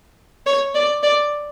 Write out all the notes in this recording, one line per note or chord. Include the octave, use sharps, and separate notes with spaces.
C#5
D5
D5